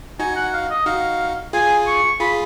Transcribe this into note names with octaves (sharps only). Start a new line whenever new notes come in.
D#4 F#4 G#5
F#5
F5
D#5
D#4 F#4 F5
F4 G#4 G#5
C#6
F4 G#4 B5